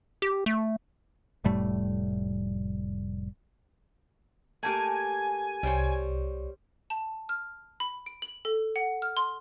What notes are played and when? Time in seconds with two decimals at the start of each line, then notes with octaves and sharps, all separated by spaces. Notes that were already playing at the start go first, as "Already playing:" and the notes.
0.22 G4
0.46 A3
1.44 F1 A2 G3 A3
4.63 A3 A#3 G4 G#5
5.63 C2 G3 C5 C#5
6.90 A5
7.29 F6
7.80 B5
8.06 D7
8.22 F#7
8.45 A4
8.76 F#5
9.02 F6
9.17 C6